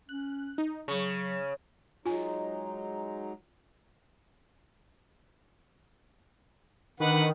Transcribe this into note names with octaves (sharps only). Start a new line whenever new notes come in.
C#4 F#6
D#4
C#3 F#3 C#6
F#3 G#3 D#4 F4 G#5
D3 D#3 B4 F#5